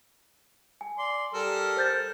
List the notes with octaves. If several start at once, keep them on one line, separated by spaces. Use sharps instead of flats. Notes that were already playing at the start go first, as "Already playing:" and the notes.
G#5
D5 C6
G3 A4 A#4
C5 G6 A6